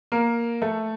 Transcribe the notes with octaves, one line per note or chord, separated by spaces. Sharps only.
A#3 A#4
A3 A4